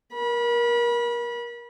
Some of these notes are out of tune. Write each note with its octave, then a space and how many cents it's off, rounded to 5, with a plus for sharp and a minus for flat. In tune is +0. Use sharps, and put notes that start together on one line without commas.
A#4 +25 B5 -30